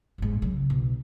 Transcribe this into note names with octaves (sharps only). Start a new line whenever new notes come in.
G1 G#2
C#3 F#3
B1